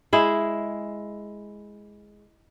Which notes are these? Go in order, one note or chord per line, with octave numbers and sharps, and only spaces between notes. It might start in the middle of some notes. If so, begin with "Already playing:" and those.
G#3 E4 G#4